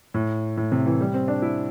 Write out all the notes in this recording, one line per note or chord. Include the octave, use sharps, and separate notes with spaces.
A2
A2
C3
E3
G3
C4
D4
E4